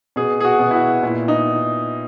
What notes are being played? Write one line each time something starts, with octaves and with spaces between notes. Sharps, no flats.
B2 G#4
G#4
F#4
B2
E4
F#4
A#2 E4
D#4